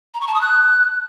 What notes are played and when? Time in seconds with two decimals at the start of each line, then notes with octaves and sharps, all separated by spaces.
0.14 A#5
0.21 C#6
0.28 A5
0.34 D#6
0.41 F#6